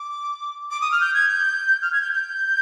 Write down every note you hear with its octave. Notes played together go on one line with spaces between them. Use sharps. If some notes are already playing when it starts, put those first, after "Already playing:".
Already playing: D6
D6
D#6
F6
G6
G#6
G6
F6
G#6
G6
G6